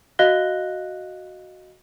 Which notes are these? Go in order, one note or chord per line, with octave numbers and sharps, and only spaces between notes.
F#4 D#5 F5 F#6 A#6 G7